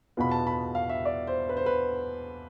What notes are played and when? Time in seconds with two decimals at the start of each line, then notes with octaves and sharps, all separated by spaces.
0.17 E2 B2 B3 F4 B5
0.31 A5
0.47 B5
0.75 F5
0.90 E5
1.05 D5
1.27 C5
1.49 B4
1.57 C5
1.66 B4